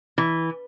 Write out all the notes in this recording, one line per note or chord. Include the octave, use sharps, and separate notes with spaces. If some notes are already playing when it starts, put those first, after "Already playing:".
E3